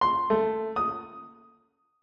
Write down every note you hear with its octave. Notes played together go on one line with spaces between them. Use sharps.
C6
A3
D#6